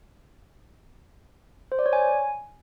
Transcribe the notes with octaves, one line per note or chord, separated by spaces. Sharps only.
C5
D5
C#5
G#5